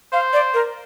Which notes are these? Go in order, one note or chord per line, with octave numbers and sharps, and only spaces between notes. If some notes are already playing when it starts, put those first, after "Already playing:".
C5 F5
D5
A#4